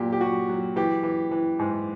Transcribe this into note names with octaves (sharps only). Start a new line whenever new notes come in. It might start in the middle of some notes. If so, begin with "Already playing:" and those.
Already playing: A#2 F#3 G4
G4
F#3 F#4
F#3
E3 G4
E3
E3
G#2